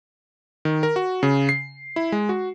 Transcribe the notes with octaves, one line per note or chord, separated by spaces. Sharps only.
D#3
A#4
F#4
C#3
C7
E4
G#3
F#4